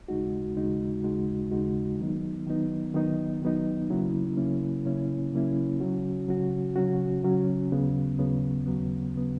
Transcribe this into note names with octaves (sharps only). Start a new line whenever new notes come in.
D#2 C#3 G#3 D#4 F#4
D#2 C#3 G#3 D#4 F#4
D#2 C#3 G#3 D#4 F#4
D#2 C#3 G#3 D#4 F#4
D#3 F#3 B3 D#4
D#3 F#3 B3 D#4
D#3 F#3 B3 D#4
D#3 F#3 B3 D#4
C#3 F#3 A#3 C#4 E4
C#3 F#3 A#3 C#4 E4
C#3 F#3 A#3 C#4 E4
C#3 F#3 A#3 C#4 E4
C#3 F#3 C#4 F#4
C#3 F#3 C#4 F#4
C#3 F#3 C#4 F#4
C#3 F#3 C#4 F#4
D#2 C#3 F#3 B3
D#2 C#3 F#3 B3
D#2 C#3 F#3 B3
C#3 F#3 B3